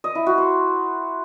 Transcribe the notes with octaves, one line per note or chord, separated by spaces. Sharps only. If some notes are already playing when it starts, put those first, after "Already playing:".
D#5
E4
F#4
C5